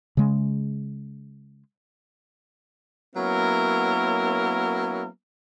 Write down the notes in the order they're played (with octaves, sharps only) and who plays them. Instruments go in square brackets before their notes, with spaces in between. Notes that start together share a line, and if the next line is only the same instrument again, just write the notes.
[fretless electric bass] C#3 G#3
[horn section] F#3 A#3 B3 C#4 E4 A#4